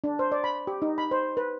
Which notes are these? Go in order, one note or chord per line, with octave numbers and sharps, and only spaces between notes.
D4
C5
D5
B5
G4
D#4
B5
C5
B4